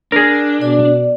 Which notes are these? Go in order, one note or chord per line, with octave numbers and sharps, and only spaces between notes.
D4 G#4 A#4
B2 D5